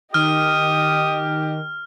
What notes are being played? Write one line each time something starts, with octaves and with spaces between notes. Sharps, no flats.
D#3 G4 D#5 D#6 F6